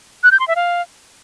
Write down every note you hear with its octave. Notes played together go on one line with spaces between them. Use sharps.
F#6
G6
C6
E5
F5